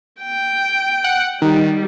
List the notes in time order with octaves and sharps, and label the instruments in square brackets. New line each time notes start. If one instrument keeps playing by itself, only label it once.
[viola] G5
[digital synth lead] F#5
[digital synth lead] D#3 [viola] G3